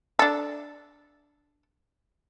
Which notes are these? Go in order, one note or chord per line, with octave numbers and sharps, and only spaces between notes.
D4 A4